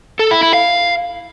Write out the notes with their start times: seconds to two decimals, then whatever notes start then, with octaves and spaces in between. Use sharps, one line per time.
0.19 A4
0.31 E4
0.43 E4
0.54 F5